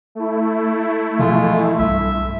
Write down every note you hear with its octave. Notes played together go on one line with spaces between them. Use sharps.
A3 E4
B2 E3 F3 G#3 F4
B1 G2 E5